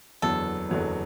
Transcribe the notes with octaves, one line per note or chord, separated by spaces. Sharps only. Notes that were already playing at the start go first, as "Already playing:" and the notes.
F#1 E2 D3 F#3 B3 A4
F#1 E2 D3 F#3 B3